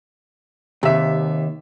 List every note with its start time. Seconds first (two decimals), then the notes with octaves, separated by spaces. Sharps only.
0.83 D#2 C3 E5